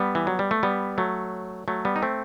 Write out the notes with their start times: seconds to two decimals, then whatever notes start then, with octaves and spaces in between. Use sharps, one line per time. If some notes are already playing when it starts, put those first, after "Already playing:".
Already playing: G3 B3
0.15 E3
0.27 F#3
0.39 G3
0.51 A3
0.63 G3 B3
0.98 F#3 A3
1.68 F#3 A3
1.85 G3 B3
1.96 D#4
2.02 A3 C4